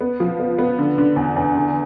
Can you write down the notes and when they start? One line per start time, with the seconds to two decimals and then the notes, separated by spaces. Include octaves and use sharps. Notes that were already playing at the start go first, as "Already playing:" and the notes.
0.01 B3
0.20 F3
0.39 B3
0.58 B3
0.79 D3
0.98 D3
1.16 E2
1.36 E2
1.55 D3